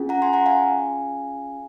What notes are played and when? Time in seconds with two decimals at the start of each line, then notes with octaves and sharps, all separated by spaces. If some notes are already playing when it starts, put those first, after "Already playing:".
Already playing: C#4 F4 G#4
0.09 F#5 A#5
0.22 G#5 C6
0.33 F#5 A#5
0.46 F5 G#5